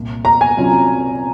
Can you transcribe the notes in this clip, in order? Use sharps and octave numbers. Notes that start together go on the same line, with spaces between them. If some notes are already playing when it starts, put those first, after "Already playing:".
Already playing: C2 A#2 A#3
A#5
G#5
C3 F#3 C#4 F4